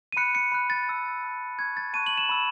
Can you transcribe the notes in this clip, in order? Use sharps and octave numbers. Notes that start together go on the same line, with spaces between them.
D#7
B5 F#6 C#7
C#7
B5 F#6
A6
A5 E6
A5 E6
A5 C#6 F#6 G#6
A6
A5 C#6 F#6 D#7
F#7
E7
B5 E6